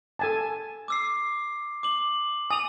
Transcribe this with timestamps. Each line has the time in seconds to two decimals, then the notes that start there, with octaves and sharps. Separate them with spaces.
0.19 A4 G#5 A5
0.88 D6 E6 C7
1.83 D6 F#7
2.51 G#5 D#6 F7